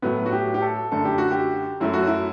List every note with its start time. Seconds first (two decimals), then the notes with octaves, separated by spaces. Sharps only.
0.02 A2 F#3 A3 B3
0.26 F#4
0.32 G4
0.54 G4
0.62 A4
0.92 F#2 D3 A3 A4
1.05 G4
1.18 F#4
1.31 G4
1.80 F#2 F#3 A3 E4
1.93 F#4
2.07 E4